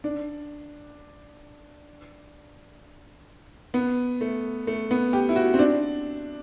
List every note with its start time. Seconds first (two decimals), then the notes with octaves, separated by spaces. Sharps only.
0.04 D4
3.74 B3
4.21 A3
4.67 A3
4.91 B3
5.13 G4
5.29 E4
5.36 F#4
5.54 C4
5.59 D4